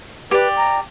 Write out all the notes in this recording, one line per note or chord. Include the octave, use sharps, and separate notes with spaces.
G4 B4 D5
A#5